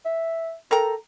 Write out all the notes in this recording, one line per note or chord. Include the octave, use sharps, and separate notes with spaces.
E5
A4 A#4 G5 A#5